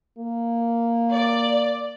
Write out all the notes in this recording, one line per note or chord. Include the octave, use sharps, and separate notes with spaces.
A#3
D5